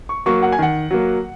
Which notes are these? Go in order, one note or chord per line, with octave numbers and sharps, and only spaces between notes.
C#6
F#3 A#3 C#6
F#5
G#5
D#3 F#5
F#3 A#3